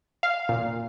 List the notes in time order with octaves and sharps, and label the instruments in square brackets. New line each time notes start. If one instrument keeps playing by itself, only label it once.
[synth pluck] F5
A#2